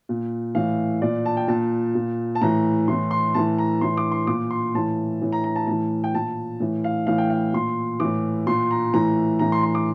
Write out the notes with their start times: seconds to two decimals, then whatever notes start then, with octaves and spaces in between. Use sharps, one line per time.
0.09 A#2
0.55 A2 E3 F5
1.02 A#2 D5
1.26 A5
1.37 G5
1.48 A#2 A5
1.95 A#2
2.35 A5
2.41 A2 E3 A#5
2.88 A2 E3 C6
3.11 C6
3.34 A2 E3 A5
3.59 A#5
3.81 A2 E3 C6
3.97 D6
4.12 C6
4.27 A#2 D6
4.51 C6
4.74 A2 E3 A5
5.22 A2 E3
5.32 A#5
5.44 A#5
5.56 A5
5.67 A2 E3 A5
6.04 G5
6.14 A#2 A5
6.60 A2 E3
6.84 F5
7.07 A2 E3 F5
7.18 G5
7.30 F5
7.53 A#2 C6
8.00 A2 E3 D6
8.47 A#2 C6
8.71 A#5
8.94 A2 E3 A#5
9.39 A2 E3 A#5
9.52 C6
9.63 C6
9.75 D6